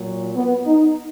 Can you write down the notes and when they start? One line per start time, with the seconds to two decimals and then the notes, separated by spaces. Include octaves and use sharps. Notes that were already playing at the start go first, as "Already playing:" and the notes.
Already playing: A#2 F#3
0.36 B3
0.66 D#4